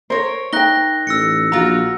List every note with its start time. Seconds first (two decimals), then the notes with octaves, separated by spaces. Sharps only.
0.10 A#4 C5 C#5
0.53 D#4 G5 F#6 A#6 G7
1.07 A1 E6 A#6 C#7
1.52 A#1 F4 F#4 A#5